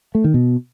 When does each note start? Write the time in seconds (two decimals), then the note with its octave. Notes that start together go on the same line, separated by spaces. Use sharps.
0.15 A3
0.24 D#3
0.34 B2